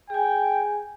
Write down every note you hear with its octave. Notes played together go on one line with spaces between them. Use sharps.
G#4 G5 G#5